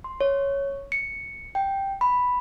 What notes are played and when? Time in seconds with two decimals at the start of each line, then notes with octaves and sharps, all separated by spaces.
0.04 C6
0.21 C#5
0.92 C#7
1.55 G5
2.01 B5